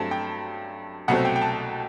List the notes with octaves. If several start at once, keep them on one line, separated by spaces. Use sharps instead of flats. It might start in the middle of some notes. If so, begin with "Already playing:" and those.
Already playing: G2 F#3 A3 C4 A5
G5
C2 B2 F#3 A3 C4 F#5
G5
G5
A5